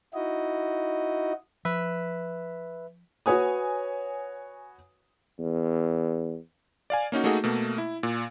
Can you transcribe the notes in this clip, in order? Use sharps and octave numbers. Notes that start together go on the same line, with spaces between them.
D#4 E4 F#4 D#5
F3 B4 E5
F#4 B4 C#5 G#5 D#6
E2
D5 F5 G#5
A#3 C#4 D#4 F#4
A3 A#3 D#4 F#4 G#4
B2 A3 A#3
E4
A#2